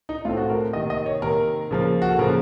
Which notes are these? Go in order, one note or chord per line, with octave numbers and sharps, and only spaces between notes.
D#4
A2 A3 C4 F4
F#4
A#4
C3 D#3 A#3 D#5
D#5
C#5
C3 D#3 A#3 A#4
C#3 F3 A#3
F#4
A4
C#3 F3 A#3 A#4